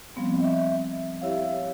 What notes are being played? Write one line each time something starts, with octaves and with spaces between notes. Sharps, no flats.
F3 G3 B3 C4
D#5 E5
E4 G4 C#5 E5 F5